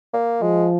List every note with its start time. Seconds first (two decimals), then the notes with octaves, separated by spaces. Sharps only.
0.14 A#3
0.42 F3 G#3